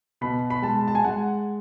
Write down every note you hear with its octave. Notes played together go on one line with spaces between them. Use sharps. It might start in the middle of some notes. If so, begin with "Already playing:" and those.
B2 B5
B5
G#3 A5
A5
G#5
G#3 F#5